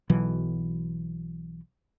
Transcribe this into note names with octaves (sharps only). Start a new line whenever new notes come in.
B1 B2 E3 F#3